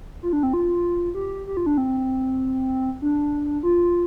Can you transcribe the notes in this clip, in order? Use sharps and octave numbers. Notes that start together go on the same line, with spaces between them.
F4
D4
C4
F4
G4
G4
F4
D4
C4
D4
F4